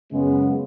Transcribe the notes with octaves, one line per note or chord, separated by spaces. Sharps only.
F#2 C#3 G#3 B3 C#4